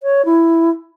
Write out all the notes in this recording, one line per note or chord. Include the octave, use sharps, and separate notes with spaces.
C#5
E4